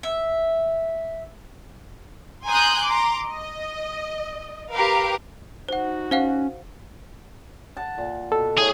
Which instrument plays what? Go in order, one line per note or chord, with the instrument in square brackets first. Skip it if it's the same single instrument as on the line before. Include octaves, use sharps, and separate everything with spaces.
[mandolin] E5
[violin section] G#5 A#5 C6 D#6 F#6 G6
A#5 C6 D6
D#5
G4 A#4 B4 F5 A#5
[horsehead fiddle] D#4 F#4 [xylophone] C5 F#5
[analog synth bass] C#4 [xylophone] C5 F5 F#5
[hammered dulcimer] F#5 A5
A#2
[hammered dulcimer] B2 [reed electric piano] A4
[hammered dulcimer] A2 C#5 [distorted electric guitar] G#4